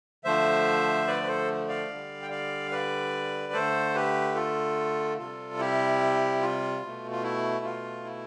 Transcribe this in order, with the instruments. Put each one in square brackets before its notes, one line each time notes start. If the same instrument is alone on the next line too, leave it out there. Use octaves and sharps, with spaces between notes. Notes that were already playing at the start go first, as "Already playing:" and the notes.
[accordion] D3 F3 A3 C5 E5
B4 D5
B4
A4 C5
D5 F5
D3 G3
G5
D5 F5
B4 D5
D3 A3 A4 C5
G4 B4
F4 A4
C3 G3 F4 A4
E4 G4
F4
B2 A3
F4
E4
F4
E4